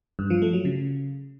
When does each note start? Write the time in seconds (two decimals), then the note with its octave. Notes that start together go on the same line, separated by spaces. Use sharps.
0.19 G2
0.30 F3
0.42 A3
0.53 F#3
0.65 C#3